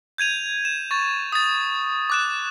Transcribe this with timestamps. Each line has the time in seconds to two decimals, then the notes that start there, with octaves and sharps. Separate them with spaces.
0.18 G6 G#6 D#7 F7
0.65 E7
0.91 C#6 A6
1.32 D#6 A6
2.10 D6 F#6 E7